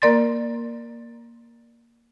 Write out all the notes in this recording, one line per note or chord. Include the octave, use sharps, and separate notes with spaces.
A#3 A#4 D5 C6 A6